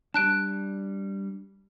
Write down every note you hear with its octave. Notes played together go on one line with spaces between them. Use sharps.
G3 D4 A5 F#6 D7